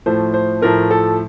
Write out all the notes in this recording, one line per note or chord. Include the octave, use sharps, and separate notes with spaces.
A2 F3 A3 C5
C5
A2 F3 A3 A#4
A4